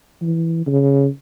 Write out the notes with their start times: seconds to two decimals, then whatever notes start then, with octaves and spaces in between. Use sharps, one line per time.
0.21 E3
0.66 C#3